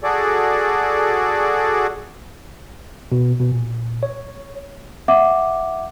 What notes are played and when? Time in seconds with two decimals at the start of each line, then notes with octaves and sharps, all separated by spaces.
0.03 F#4 G#4 A4 D5
3.12 B2
3.40 B2
3.52 A#2
4.03 C#5
5.08 E5 F#5 D6